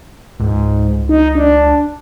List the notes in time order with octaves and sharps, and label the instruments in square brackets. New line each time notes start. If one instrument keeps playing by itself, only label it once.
[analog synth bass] C#2 [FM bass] G#2
[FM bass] D#4
D4